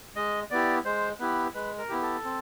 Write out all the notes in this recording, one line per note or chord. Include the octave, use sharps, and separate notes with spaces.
G#3 D#5
B3 E4 G4 D5
G#3 C5
B3 E4 G4 B4
G#3 B4
A#4
B3 E4 G4
A4
C4